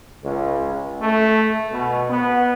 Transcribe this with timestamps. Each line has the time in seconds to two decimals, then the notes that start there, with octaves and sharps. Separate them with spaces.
0.22 C#2
1.00 A3
1.71 B2
2.09 B3